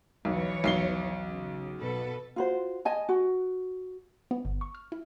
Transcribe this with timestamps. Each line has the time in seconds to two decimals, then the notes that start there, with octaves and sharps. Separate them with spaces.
0.25 B1 E2 E3 C#5
0.64 B1 C7 G7
1.26 C#3
1.80 B2 A4 B4
2.36 F4 F#4 C5
2.85 D#5 G#5 A5
3.09 F#4
4.31 B3
4.45 G1
4.61 C#6
4.75 F6
4.92 E4